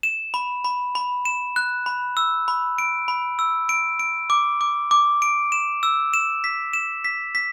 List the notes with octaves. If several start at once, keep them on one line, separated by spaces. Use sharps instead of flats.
E7
B5
B5
B5
E7
F#6
B5
E6
B5
D7
B5
E6
D7
D7
D6
D6
D6
D7
E7
E6
E7
B6
E7
B6
B6